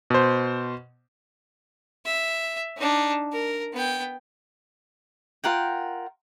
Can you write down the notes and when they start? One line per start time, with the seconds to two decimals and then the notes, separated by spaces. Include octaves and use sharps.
0.10 B2 C5
2.05 E5
2.77 D4 D#4
3.32 A#4
3.73 B3 G5
5.44 F4 A#4 F#5 G5